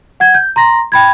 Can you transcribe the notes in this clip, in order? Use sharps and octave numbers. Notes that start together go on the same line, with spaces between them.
F#5 G#6
G6
A#5 C6 A#6
G5 B5 G#6